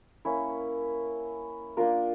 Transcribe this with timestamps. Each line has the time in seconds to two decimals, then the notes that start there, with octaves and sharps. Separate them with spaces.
0.25 A#3 C#4 E4
1.77 A#3 D4 F4 A#4